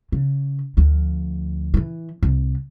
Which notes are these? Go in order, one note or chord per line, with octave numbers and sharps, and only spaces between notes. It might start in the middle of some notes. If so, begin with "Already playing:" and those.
C#3
D2 F3
D#3 E3
C2